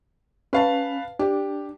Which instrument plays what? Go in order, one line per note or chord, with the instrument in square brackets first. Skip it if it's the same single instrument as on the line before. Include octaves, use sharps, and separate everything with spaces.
[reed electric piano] C#4 [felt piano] B4 F5 A5
[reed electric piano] D4 [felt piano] G4